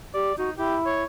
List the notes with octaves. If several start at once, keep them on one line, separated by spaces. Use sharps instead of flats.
G4 D5
D#4 F#4
E4 G4
C#5